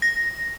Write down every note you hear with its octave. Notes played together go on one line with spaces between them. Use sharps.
A#6